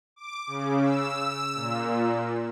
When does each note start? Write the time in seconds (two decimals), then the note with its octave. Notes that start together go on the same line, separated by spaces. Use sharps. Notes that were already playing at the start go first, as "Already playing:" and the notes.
0.16 D6
0.47 C#3
0.82 E6
1.55 A#2